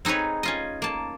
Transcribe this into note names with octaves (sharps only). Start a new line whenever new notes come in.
C4 D#4 G#4 B4 C#5
C#4 F4 D#5
A#3 A5